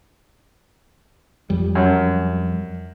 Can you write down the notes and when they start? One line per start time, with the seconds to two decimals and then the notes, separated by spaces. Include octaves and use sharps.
1.50 F2 G3
1.75 F#2